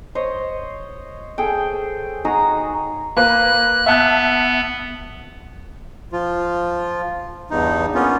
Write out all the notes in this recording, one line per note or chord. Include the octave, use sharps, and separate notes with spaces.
C5 C#5 D#5
G#4 A4 G5
D#4 F#4 G#4 A#5
A#3 B4 F#6
B3 E5 A5 F#6
F3 F4
E2 G2 D#4
A#3 B3 C#4 F4